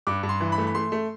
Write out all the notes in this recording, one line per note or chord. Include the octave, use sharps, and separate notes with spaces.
G2 D6
G2
C6
E3
B5
A3
B5
A3 C6
A3